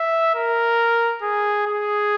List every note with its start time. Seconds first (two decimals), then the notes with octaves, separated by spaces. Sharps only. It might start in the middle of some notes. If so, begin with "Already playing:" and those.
Already playing: E5
0.35 A#4
1.22 G#4
1.66 G#4